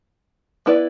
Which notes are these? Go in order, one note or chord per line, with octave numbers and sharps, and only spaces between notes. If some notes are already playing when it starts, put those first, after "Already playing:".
B3 E4 B4 D5